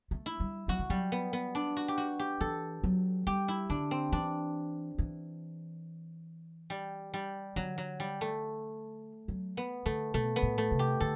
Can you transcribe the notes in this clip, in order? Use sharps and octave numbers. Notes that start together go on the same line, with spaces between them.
A3
E4
G3
F#3 F#4
E3
F#3 G3
B3
B3
D4
F#4
G4
F#4
G4
E3 A4
F#3
G3 G4
E4
D3 D4
C4
E3 D4
E3
G3
G3
D3 F#3
F#3
G3
A3
F#3
B3
D3 A3
B2 A3
B3
A2
A3
C3
G4
D3 A4